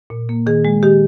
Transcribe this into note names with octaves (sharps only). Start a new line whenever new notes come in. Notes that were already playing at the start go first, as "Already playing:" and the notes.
A#2
A#3
D#3 G#4
G#3
D#3 G4